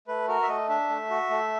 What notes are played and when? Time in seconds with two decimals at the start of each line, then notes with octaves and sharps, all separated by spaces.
0.08 A3 B4
0.28 F#4 A#4
0.43 E5
0.48 A3 D#5
0.69 D4 E5
0.89 A3
1.10 F#4
1.30 A3